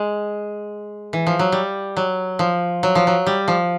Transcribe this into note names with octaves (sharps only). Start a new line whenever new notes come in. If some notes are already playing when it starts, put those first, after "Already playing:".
Already playing: G#3
E3
F3
F#3
G3
F#3
F3
F#3
F3
F#3
G3
F3